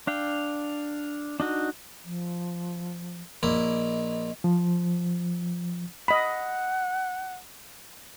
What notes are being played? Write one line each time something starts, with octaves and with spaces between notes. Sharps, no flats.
D4 F5 G5
D4 D#4 F#4
F3
A#1 A#3 E4 D#5
F3
D#5 F#5 B5